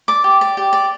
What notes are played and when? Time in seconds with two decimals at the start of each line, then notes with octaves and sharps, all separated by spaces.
0.08 D5 D6
0.24 G4
0.41 D5
0.57 G4
0.73 D5